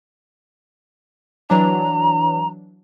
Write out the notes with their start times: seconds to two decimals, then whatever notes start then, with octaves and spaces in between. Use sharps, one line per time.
1.50 E3 F#3 D4 A#5